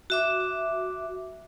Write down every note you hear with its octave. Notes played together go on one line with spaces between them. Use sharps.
F#4 E5 D6